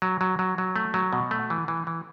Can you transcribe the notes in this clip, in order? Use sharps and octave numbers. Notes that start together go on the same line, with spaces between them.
F#3
F#3
F#3
F#3
A3
F#3
B2
A3
E3
E3
E3